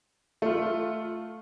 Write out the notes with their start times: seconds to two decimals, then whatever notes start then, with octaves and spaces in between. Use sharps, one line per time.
0.42 A3 F4